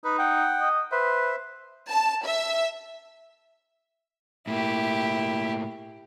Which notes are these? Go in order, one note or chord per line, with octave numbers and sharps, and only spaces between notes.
D#4 B4
F#5 G5
D#5
B4 C5 E5
A5
E5
A2 A#3 E4 G4